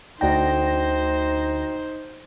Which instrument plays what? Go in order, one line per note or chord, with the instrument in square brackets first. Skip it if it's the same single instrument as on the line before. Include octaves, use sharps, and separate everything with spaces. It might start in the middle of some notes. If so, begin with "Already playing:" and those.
[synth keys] D2 A#6 [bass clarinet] D#4 [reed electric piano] F#4 D5 G5 [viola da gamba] C5